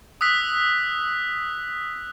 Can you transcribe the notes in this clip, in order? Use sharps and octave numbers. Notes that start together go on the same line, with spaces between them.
D#6 E6 F#6 B6